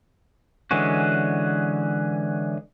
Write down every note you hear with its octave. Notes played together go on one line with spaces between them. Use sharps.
D3 E3 G#3 C#4 F#4